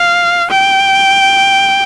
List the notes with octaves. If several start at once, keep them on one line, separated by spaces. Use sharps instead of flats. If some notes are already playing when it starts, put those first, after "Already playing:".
Already playing: F5
G5